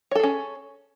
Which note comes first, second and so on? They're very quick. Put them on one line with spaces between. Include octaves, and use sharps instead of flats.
C#5 A4 G#4 C#4